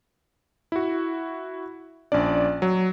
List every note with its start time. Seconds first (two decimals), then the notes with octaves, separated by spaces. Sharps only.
0.72 E4 F#4
2.12 A#1 C#4 D4 D5
2.62 F#3